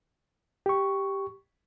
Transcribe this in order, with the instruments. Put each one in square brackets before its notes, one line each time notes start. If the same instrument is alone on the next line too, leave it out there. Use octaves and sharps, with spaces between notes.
[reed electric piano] G4 C#6